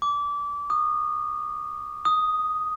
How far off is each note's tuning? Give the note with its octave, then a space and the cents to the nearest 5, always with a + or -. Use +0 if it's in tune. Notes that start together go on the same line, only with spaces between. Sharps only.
D6 -25
D#6 -25
D#6 +0